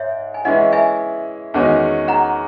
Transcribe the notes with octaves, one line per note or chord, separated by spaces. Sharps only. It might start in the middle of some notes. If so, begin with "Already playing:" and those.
Already playing: G#2 C#5 E5
G#5
E3 G#3 C#4 E4 D#5 F#5
E5 G#5
E2 D#3 G#3 C#4 F#4
F#5 A#5